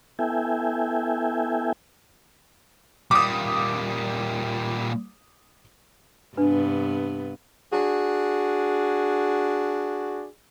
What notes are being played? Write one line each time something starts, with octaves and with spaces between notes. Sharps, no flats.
B3 E4 A4 E5 G5 G#5
A#2 G3 D6 D#6
G2 C3 B3 D4 B4
D4 F#4 G#4